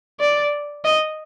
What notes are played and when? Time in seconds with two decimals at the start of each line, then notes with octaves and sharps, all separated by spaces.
0.20 D5
0.85 D#5